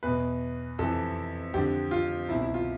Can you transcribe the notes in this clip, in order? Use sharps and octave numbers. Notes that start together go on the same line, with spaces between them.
E2 B2 B4
F2 C3 E3 A4
F2 D3 G4
F4
C2 B2 E4
E4
F4